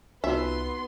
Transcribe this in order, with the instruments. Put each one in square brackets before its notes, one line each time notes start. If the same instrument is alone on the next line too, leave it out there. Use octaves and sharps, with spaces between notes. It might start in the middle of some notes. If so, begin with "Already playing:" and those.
[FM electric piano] C2 F4 [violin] B3 C6 [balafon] C4 D#4 F#4 [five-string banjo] E5